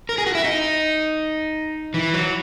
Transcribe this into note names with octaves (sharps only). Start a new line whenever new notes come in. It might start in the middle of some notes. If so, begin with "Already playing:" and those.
A#4
G#4
F#4
E4
D#4
E3
F#3